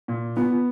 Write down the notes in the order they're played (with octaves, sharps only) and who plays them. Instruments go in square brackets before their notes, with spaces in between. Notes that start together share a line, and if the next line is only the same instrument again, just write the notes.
[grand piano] A#2
[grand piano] B3 [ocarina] F4